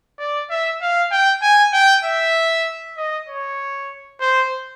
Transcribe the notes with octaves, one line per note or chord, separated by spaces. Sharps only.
D5
E5
F5
G5
G#5
G5
E5
D#5
C#5
C5